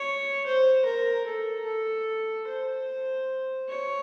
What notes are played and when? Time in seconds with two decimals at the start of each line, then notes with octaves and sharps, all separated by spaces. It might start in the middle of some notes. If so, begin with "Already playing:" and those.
Already playing: C#5
0.45 C5
0.85 A#4
1.25 A4
1.66 A4
2.47 C5
3.69 C#5